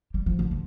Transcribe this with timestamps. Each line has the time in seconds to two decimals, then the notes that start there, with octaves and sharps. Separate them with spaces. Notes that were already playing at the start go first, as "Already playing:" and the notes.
0.14 G3
0.26 F3
0.39 D3
0.51 F3